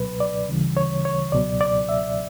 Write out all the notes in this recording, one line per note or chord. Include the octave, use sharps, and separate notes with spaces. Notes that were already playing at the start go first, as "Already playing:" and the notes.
Already playing: C#2 B2 F#3 B4
D5
D2 C#3 E3 G3
C#5
C#5
C#2 B2 F#3 D5
D5
E5